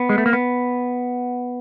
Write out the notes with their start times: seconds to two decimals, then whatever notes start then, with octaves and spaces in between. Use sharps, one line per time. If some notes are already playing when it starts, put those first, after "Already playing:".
Already playing: B3
0.09 G#3
0.18 A3
0.26 A#3
0.33 B3